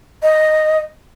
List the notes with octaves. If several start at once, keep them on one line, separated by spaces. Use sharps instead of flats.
D#5